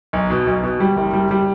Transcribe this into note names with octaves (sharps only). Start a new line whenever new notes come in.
B1
B2
B1
B2
G3
F#1
G3
G3